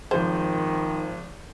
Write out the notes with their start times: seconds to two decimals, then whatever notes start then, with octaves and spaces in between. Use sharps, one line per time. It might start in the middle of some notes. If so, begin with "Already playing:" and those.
0.11 G#1 D#3 F3 C5 G6